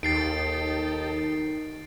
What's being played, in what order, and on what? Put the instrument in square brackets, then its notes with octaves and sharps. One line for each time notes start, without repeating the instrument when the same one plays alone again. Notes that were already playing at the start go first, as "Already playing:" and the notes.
[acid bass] D#2 [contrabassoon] D#3 [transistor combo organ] D#4 G4 A4 [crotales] A6 C7 D7